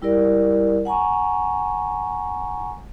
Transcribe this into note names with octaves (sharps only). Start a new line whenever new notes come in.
G3 E4 G4 A#4 D5
F#5 G#5 A#5 C#6